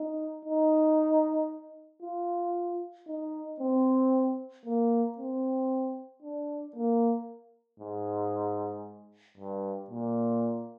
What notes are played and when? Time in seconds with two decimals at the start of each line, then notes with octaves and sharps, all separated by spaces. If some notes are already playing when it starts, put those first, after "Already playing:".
Already playing: D#4
0.45 D#4
2.02 F4
3.08 D#4
3.60 C4
4.66 A#3
5.18 C4
6.23 D4
6.76 A#3
7.80 G#2
9.37 G2
9.90 A#2